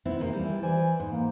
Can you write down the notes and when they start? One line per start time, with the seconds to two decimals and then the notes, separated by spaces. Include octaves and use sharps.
0.05 B3 C4 E4
0.20 C3 A#3 D#4
0.33 E3 G3 E4
0.62 E3 C5 D5 G#5
1.00 G#2
1.11 A#3